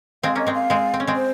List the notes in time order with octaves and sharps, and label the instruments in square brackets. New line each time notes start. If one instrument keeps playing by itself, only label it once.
[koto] G#3 C4 [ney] F5
[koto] A#3 C#4 [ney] D#5
[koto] G#3 C4
[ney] F5
[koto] G#3 C4
C4
C#4
G#3 C4
[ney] C5